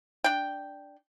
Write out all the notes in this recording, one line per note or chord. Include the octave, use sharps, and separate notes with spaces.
D4 G5